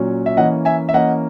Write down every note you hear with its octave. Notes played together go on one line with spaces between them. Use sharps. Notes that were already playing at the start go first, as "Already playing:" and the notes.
Already playing: A#2 F#3 C#4
E5
E3 A#3 C#4 D#5 F#5
E5 G#5
E5
E3 A#3 C#4 D#5 F#5